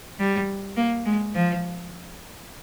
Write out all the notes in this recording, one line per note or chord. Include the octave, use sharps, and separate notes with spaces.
G3
A#3
G#3
F3